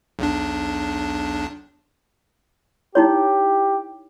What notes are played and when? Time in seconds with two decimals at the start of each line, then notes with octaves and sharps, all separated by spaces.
0.19 B1 E2 D4
2.95 D#4 E4 G4 C#5